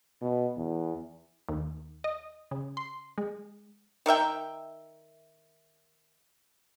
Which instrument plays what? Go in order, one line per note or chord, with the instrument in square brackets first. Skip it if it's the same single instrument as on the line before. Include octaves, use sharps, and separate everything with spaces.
[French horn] B2
E2
[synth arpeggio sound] D#2
D#5
C#3
C6
G#3
[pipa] D#3 A#4 E5 G5